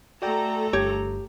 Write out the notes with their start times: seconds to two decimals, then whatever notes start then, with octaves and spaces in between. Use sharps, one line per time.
0.22 A3 F#4 A4 D5 G5 A#5
0.73 G1 G2 G4 C#5